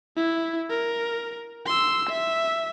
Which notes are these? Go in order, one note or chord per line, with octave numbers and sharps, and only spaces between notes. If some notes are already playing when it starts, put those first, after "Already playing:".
E4
A#4
C6 E6
E5